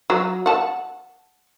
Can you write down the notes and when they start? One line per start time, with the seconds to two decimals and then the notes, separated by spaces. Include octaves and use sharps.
0.10 F#3
0.46 F#5 A5